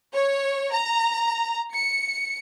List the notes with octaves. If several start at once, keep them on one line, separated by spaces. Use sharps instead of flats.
C#5
A#5
C#7